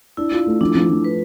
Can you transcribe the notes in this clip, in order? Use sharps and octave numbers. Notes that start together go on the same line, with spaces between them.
D4 E4
F4
A3
F3 D4
F3
F3
B4